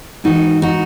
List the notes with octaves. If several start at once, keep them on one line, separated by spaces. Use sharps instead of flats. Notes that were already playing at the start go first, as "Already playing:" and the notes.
G#2 E3 D#4 F#4
D#4 F#4